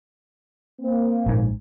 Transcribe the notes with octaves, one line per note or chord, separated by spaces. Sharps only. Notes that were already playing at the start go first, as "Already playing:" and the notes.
A#3 C4
A#1 G#2